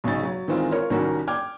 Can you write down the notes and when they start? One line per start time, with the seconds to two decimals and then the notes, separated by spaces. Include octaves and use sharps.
0.04 B1 C#3 D#4 A6
0.23 F#3
0.48 D#3 E3 G#3 C4 F4
0.72 F4 A#4 C#5
0.90 C2 D#3 G3 C#4 F#4 A#4
1.28 G5 D6 F6 G#6